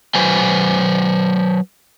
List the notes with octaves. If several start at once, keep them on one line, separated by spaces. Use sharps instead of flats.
F#3 B4 C5 G#5